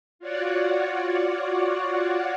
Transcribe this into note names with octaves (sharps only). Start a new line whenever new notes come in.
F4 F#4 C#5 D5 F#5